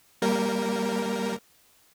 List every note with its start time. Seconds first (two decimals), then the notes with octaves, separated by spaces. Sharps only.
0.22 G3 A#3 A#4